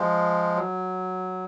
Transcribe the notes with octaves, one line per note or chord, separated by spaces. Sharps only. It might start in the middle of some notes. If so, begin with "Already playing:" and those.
Already playing: F3 G#3
F#3